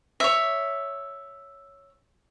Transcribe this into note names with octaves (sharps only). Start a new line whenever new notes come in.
C#5 E5